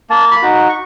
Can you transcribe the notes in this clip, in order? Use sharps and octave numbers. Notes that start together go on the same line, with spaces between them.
A#3 A5
B5
D#4 F#4
C#6